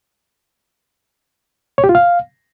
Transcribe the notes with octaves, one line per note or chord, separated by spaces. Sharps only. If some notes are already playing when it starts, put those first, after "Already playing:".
C#5
G4
F4
F5